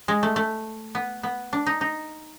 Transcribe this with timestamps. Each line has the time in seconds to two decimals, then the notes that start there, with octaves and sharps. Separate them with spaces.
0.08 G#3
0.23 A3
0.36 A3
0.95 B3
1.23 B3
1.53 D4
1.66 D#4
1.81 D#4